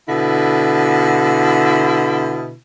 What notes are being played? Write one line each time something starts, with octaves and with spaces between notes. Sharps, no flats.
B2 D3 E4